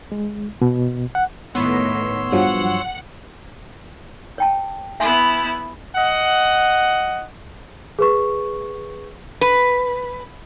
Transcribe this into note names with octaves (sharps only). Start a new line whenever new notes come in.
G#3
B2
F#5
A2 D#3 B3 C#5 C6 E6
G2 F3 F#3 F#5
C#5 G5 A5
B3 E4 E5 G#5 C6
D#5 F#5
G#4 B4 C#6
B4